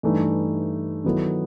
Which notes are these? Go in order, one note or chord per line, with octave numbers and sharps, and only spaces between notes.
G2 E3 A3 D#4
D#3 F#3 B3 E4 A4